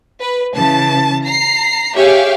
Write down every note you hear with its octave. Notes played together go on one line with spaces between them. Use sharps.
B4
C#3 E3 A5
A#5 C7
G4 G#4 C#5 E5 F5 G5